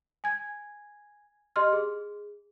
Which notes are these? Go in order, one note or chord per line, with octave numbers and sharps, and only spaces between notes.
G#5 G#6
G4 D#5 C6 F6
G#4